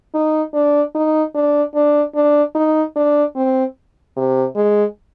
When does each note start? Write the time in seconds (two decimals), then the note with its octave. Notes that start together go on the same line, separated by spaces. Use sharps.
0.14 D#4
0.54 D4
0.95 D#4
1.35 D4
1.75 D4
2.15 D4
2.55 D#4
2.96 D4
3.36 C4
4.17 C3
4.56 G#3